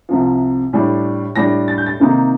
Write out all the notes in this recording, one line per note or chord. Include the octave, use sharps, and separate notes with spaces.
C2 C3 F3
A2 G3 D4
A2 G3 D4 A#6
A6
G6
A6
C3 D#3 A#3 D#4